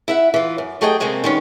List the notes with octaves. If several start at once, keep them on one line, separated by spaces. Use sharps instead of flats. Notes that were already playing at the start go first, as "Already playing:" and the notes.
E4 E5 F#5
E3 F4
F#2
F#3 A3 G4 G#4 D#5 G5
C3 G#3 A#3 C4 C#4
D#3 G3 G#3 B3 C#4